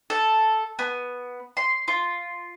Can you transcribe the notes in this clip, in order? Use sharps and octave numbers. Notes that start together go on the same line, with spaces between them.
A4
B3
C6
F4